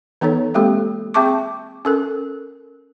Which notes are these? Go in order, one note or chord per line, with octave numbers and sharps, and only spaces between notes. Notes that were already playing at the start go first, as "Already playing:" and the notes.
E3 B3 D#4 A4 C#5
G#3 A#3 C4 G4 A4
C4 G#4 E5 A5 C#6 D6
C#4 A4 A#4